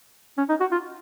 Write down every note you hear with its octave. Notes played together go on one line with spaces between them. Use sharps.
C#4
D#4
F#4
F4